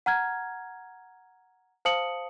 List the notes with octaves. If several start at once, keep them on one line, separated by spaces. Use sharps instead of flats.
F#5 A#5 F6 G#6
C5 F5 A5 D#6 C#7 F#7